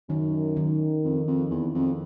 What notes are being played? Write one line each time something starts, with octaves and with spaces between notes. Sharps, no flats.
F#2 D#3
D#3
F2
F2
E2
F2